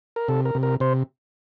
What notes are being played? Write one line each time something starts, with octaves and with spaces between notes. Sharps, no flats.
A#4
C3 A4
A#4
C3
A#4
C3 C5